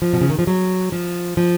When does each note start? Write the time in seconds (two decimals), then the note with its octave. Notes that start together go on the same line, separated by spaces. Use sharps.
0.02 F3
0.13 B2
0.21 C#3
0.30 D#3
0.39 F3
0.47 F#3
0.92 F3
1.37 F3